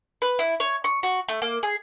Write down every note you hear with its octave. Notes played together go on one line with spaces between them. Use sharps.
B4
E4
C#5
C#6
F#4
A3
A#3
G#4